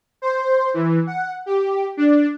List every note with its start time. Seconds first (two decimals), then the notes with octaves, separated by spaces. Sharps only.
0.22 C5
0.74 E3
1.07 F#5
1.46 G4
1.97 D4